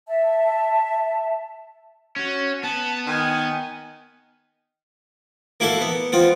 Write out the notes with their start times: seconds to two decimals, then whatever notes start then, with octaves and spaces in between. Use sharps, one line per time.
0.07 E5 A5
2.16 C#4 F#4
2.63 B3 A5
3.07 D#3 G#5
5.60 A#3 E4 F#4 A4
5.81 B3
6.12 B3 C4 F4